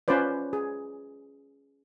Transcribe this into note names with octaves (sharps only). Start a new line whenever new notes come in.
C#4 F4 B4 C5 D5
G#4